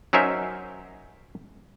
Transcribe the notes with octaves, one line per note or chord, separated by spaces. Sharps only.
F#3 C#4 D#4 A#4 C5 E5